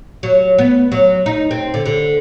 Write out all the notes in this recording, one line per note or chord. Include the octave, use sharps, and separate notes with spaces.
F#3
B3
F#3
D#4
C4
D3
D3